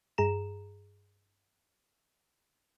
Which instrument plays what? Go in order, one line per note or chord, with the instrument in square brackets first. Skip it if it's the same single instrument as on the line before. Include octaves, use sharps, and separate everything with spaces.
[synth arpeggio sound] G2 G#4 A#5 E7